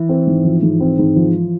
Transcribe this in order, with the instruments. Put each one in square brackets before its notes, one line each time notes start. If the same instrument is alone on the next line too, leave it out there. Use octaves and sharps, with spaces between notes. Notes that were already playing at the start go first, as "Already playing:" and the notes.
Already playing: [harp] E3
[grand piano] C4
G#2
F3
G#2
C4
G#2
F3